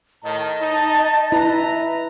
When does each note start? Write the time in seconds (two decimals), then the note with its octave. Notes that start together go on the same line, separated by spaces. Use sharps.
0.24 A2 D#3 D#5 A5
0.61 D#4
1.32 E4 B4 A#5